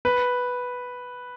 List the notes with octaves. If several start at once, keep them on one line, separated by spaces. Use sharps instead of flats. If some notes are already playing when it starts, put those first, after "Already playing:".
B4